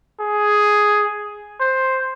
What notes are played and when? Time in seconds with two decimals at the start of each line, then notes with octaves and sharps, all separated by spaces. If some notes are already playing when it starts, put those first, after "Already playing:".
0.20 G#4
1.60 C5